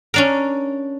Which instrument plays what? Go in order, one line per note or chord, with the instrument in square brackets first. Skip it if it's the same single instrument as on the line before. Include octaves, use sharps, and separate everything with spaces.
[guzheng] C#4 D4 A#4